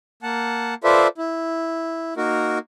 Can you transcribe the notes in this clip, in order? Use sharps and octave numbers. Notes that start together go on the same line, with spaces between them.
A#3 F#5 A5
F4 A4 B4 C5 D5 E5
E4
A#3 D#4 F#4 A#4